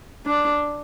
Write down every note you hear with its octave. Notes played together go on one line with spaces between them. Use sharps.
D4